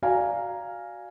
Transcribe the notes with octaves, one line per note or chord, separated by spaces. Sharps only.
F#4 D5 F5 G#5 A#5